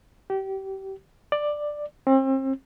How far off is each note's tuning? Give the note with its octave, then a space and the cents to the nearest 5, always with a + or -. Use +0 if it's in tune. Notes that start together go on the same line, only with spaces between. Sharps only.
G4 -25
D5 +10
C4 +35